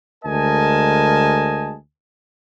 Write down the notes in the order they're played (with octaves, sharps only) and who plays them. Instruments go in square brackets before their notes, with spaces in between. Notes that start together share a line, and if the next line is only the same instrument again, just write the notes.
[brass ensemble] D2 G#3 A#4 D#5 G#5 A5